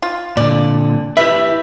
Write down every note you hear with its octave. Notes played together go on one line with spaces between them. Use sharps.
F4
A#2 D3 D5
E4 G4 B4 E5